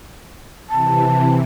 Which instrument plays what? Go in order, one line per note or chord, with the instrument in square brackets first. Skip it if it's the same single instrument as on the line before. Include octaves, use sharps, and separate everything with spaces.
[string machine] C3 E3 [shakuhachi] A5